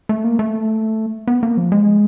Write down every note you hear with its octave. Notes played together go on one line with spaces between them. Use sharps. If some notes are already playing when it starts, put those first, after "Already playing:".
A3
A#3
A3
B3
A#3
F3
G#3